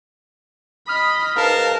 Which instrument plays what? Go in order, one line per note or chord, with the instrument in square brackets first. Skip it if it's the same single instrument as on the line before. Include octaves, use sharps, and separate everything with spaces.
[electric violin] D#5 B5 [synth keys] D#6 F6
[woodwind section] G#2 B4 F5 [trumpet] A#4 [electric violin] A5